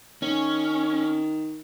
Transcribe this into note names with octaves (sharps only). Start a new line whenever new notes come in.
D#3 C#4